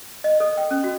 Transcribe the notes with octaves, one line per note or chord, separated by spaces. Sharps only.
D#5
A4
G5
C#4
F#4